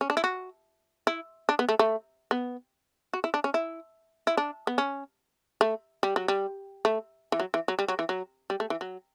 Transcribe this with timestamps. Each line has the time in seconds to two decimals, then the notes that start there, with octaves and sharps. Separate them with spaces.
0.01 C#4
0.10 D4
0.17 E4
0.24 F#4
1.07 E4
1.49 D4
1.59 B3
1.69 A3
1.79 A3
2.31 B3
3.13 F#4
3.24 E4
3.34 D4
3.44 C#4
3.54 E4
4.27 E4
4.37 D4
4.67 B3
4.78 C#4
5.61 A3
6.03 G3
6.16 F#3
6.28 G3
6.85 A3
7.32 E3
7.40 F#3
7.54 E3
7.68 F#3
7.79 G3
7.88 F#3
7.99 E3
8.09 F#3
8.50 G3
8.60 A3
8.70 E3
8.81 F#3